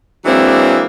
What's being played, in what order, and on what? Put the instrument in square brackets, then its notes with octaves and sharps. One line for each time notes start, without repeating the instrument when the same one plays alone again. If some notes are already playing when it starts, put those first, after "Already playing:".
[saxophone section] E3 F#3 G#3 A#3 C4 D4